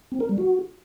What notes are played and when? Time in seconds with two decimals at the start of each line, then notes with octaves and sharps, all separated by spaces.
0.12 C4
0.20 A#4
0.29 G3
0.38 F#4